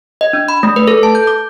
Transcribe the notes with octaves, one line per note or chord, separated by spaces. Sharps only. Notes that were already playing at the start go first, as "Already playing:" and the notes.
D#5
D4
B5
A3
B4
A4
A5
G6
D6